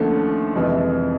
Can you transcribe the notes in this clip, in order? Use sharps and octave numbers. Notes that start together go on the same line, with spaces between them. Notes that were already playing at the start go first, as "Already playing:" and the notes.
Already playing: D#2 D3 F3 A3 C#4
F2 C3 E3 G#3